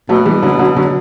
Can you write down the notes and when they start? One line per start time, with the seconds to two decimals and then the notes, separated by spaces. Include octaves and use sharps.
0.09 B2 F#3 A3
0.25 E3 G3
0.42 D3 F#3
0.59 D3 F#3
0.76 D3 F#3